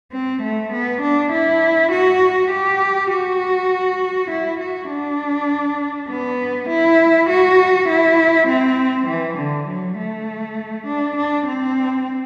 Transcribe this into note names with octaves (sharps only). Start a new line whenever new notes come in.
C4
A3
B3
D4
E4
F#4
G4
F#4
E4
F#4
D4
B3
E4
F#4
E4
C4
E3
D3
F#3
A3
D4
D4
C4